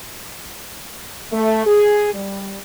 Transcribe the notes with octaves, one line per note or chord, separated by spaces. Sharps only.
A3
G#4
G3